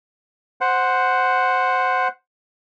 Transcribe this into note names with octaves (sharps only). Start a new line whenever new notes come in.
C5 F#5